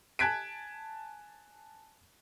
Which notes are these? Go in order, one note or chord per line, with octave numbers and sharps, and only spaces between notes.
G#5 A5 F#6 G#6 B6 D7